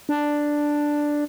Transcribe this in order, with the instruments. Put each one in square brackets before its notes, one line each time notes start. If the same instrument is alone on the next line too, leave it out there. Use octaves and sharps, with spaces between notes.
[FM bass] D4